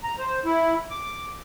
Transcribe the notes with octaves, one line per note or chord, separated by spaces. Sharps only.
A#5
C5
E4
D6